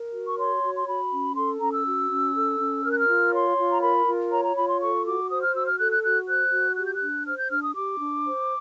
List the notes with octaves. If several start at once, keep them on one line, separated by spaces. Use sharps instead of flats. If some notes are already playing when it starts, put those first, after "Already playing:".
Already playing: A#4
F#4
C#6
C#5 C6
F#4
C6
F#4 B5
C#4
A4 C6
C#4 A#5
E6
F#4
C#4
A4
C#4
A#4 F6
F#6
F6
F4
C#5 C6
F4
A#5
A#4 B5
F4
C#5 A#5
A#5
F4 B5
C6
A4 C#6
F#4 D6
C5 D#6
F6
F#4 E6
F6
A4 F#6
F#6
F#4 F#6
C5 F#6
F#4
G4 F#6
G6
F#6
D4
C5 F6
G6
D4 F6
D#6
G4 D6
D4
C5